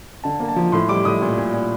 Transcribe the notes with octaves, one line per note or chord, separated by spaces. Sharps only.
D3 A5
A#3
A5
F3
A2 C6
G3 D6
A2 D#6
A#2
A#2
A#2